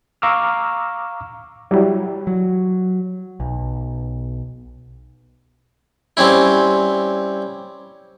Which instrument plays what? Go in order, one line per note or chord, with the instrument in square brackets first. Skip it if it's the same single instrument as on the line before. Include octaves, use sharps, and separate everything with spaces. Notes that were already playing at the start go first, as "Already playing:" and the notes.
[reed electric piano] F5 A#5 C#6 D6 E6 F6
F#3 G3 E4 G4
[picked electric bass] F#3
B1
[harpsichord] G3 C4 C#4 E4